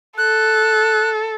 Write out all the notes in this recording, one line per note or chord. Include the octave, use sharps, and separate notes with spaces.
A4 F#6